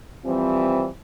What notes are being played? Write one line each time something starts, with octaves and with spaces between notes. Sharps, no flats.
E3 F3 G3 C4